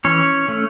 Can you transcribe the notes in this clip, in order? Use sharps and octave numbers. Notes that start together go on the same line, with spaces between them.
E3 C#4 C#5
A3 C#4